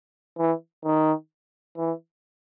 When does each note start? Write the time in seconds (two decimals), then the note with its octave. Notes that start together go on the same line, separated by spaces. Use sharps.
0.38 E3
0.85 D#3
1.78 E3